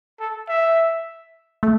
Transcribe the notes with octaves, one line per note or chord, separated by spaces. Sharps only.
A4
E5
A3